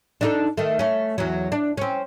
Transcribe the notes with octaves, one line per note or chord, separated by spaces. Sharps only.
D4 D#4 A4
D#3 A3
A3 C#4
E2 F#3
D4
C4 C#4